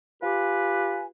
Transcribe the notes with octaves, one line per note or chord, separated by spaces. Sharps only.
F4 G4 B4 G#5